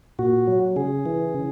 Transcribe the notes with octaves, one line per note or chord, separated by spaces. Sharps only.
A#2 F#4
F#3
C#3 G#4
E3
C#3